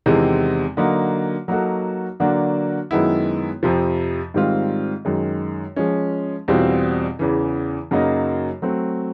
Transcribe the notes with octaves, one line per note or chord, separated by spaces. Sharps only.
E2 C3 D#3 G#3 C4
D3 F#3 A#3 D#4
F#3 A#3 D#4 F#4 A4
D3 F#3 A#3 D4 F#4
F#2 D#3 G#3 B3 E4
F2 C3 F3
G#2 D#3 G3 C4 F4
F#2 D#3 G#3
F3 G#3 C#4
E2 B2 G3 C4 F4
E2 C#3 E3
F#2 C#3 F#3 A#3 D#4
F#3 A3 C4